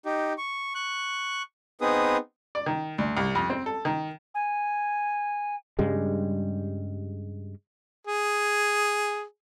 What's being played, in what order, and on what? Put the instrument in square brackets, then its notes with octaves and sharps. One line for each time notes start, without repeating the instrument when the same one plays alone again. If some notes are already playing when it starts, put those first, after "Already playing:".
[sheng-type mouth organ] D#4 G4
C#6
C#6 F#6
B3 C4 D#4 G#4 B4 D#6
[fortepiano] D5
D#3
D2
C2
F2
C4
A4
D#3
[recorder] G#5
[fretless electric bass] G2 C#3 G3 G#3
[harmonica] G#4